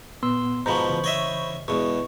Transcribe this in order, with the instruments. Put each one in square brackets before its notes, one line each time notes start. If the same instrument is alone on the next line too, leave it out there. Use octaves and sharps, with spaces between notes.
[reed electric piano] A#2 B3 [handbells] C6 E6
[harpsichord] G#2 B2 F3 [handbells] C5 B5 C#6 [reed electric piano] A#5
[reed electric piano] C#3 E3
[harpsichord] C#5 D#5 E5
[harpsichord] E2 B2 [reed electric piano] G#3 G#4 [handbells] C#6